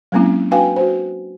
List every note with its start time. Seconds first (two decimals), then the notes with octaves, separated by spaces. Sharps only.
0.12 F#3 G#3 A#3 C4 C#4 E4
0.51 D4 F#4 B4 F5 G5 G#5
0.76 F#4 C5